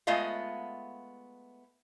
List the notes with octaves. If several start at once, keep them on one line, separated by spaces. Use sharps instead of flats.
G#3 A3 B3 F4 D#5 F5